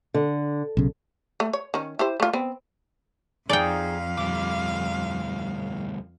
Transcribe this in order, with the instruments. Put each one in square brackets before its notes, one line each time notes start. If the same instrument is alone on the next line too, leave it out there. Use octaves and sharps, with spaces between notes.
[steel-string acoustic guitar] D3
[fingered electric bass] B1 C#3
[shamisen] A3
C#5
D#3 C#4
E4 G4 C5
A3 F4
B3 C4
[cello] F2 F5 [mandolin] D#4 G#4 C5 [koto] D5 G5
[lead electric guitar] D2 G3 [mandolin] D6